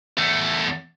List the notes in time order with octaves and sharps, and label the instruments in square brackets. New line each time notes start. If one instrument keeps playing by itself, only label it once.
[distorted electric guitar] E2 A3